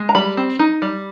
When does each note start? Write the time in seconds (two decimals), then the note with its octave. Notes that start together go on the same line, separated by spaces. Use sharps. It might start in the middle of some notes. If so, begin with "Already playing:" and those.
Already playing: G#3
0.09 A#5
0.15 G3 B5
0.37 C4
0.59 D#4
0.82 G3